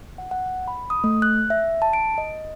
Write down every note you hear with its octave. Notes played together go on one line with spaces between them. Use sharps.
F#5
F#5
B5
D#6
A3
F#6
E5
A5
D7
D#5